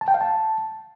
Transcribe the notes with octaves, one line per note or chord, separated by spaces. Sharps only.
A5
G5
F5
A5